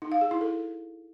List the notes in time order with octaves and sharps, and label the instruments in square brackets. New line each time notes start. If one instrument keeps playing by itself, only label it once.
[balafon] D#4
F5
G#4
E4
A4